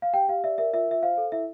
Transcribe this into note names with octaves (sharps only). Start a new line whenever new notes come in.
F5
G4 G5
G4 F5
D5 E5
A#4 E5
F4 E5
F4 E5
C5 F5
A4
E4 E5